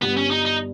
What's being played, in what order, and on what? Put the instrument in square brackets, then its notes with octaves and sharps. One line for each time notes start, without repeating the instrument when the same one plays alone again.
[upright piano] G1 G2 G3 [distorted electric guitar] B3
[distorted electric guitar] C#4
D#4
D#4